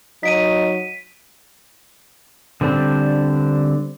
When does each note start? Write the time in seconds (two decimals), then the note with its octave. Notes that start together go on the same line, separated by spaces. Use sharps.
0.23 F#3 D#4 B6 D7 D#7
2.61 D3 G3 C4 D4